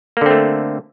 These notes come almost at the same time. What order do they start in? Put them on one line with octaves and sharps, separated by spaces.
A#3 D3 C4 A3